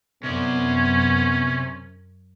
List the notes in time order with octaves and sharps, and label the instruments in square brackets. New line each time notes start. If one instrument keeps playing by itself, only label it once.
[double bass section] F#2 [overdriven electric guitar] C3 D5 [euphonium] B3 [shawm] C#4